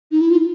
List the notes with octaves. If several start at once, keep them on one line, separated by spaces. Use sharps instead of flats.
D#4
E4
F4